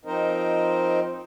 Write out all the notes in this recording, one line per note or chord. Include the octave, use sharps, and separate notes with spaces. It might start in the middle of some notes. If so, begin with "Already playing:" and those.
F3 C4 D#4 A#4 C5 D#5